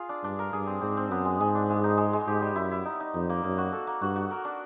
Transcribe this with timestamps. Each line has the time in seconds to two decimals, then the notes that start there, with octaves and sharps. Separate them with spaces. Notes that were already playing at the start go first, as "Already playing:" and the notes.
Already playing: F4 G#4
0.09 D4
0.23 G2 D4
0.39 A#4
0.53 G2 G#4
0.67 C4
0.81 G#2 C4
0.97 C4
1.10 F#2 B3
1.25 G#3
1.40 G#2 G#3
1.55 D4
1.70 G#3
1.84 D#4
1.97 G#3
2.13 G#3
2.27 G#2 G4
2.42 G3
2.56 F#2 E4
2.71 E4
2.85 D#4
3.00 D#4
3.14 F2 D#4
3.30 A#3
3.44 F#2 A#3
3.58 F#4
3.72 A4
3.87 A#3
4.01 G2 F#4
4.16 F#4
4.30 A#4
4.45 D4